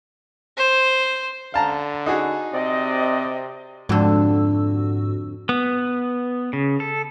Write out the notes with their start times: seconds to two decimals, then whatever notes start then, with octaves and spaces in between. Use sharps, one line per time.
0.57 C5
1.54 D3 F5 A5 A#5
2.06 D#4 F#4 G#4
2.53 C3 C4 D5 D#5
3.89 F2 G#2 D3 F#4 E6
5.49 B3
6.53 C#3
6.80 A4